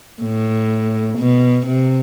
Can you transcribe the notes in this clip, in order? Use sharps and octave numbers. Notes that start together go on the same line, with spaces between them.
A2
B2
C3